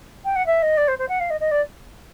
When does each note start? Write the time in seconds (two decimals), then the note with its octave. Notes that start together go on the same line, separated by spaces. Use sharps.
0.25 G5
0.35 F#5
0.46 E5
0.62 D#5
0.77 D5
0.88 C5
0.98 C5
1.08 F#5
1.20 F5
1.30 D#5
1.40 D#5
1.51 D5